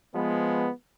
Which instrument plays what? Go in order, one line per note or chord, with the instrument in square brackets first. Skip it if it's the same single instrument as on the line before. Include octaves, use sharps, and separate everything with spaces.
[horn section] F3 G#3 B3